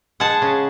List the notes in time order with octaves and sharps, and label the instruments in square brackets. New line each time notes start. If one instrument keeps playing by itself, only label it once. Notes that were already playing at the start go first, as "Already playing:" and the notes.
[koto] G#3 F#5 A5
C#3